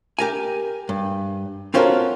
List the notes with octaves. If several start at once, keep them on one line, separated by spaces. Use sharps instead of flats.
G4 A#4 G#5
G2
C4 C#4 F4 F#4 A4 A#4